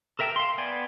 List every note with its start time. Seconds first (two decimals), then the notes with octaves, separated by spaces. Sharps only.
0.19 A4 A#4 E5 G5 A5
0.36 F5 C6
0.58 B3 D5 G5 G#5